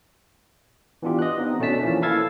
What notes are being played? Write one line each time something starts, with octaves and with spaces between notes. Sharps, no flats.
E3 B3 D4 F4 G4
D#5 F#6
B3 C4 D#4
B2 A3 C#4 D4 A5 B6
E3 F3 A#3 C#4
E4 A4 F5 E6 G#6 A6